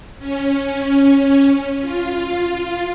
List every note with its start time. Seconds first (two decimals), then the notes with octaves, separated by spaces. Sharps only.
0.19 C#4
1.82 F4